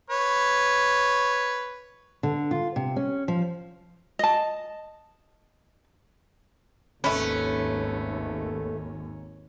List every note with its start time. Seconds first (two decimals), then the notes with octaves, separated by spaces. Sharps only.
0.10 B4 C#5
2.23 D3
2.51 F4
2.76 C3
2.96 C#4
3.28 F3
4.19 D#5 A5
7.04 G#1 D#2 A3 C#4 B4